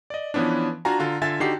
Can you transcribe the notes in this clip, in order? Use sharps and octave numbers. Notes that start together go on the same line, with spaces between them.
D5 D#5
E3 F3 B3 C#4 D4
D4 F4 F#4 F5 G#5 A#5
D3 F4 A#5
D3 F4 E5 G#5 A6
D3 D#4 F#4 G4 C7